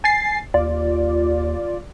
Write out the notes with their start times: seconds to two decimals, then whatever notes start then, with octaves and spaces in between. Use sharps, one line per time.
0.04 G#5 A6 C7
0.54 D#2 F4 D5